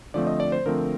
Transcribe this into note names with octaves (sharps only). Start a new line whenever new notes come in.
D3 F3 A3 C4 D5
D#5
D5
C5
D3 F3 A3 C4 A#4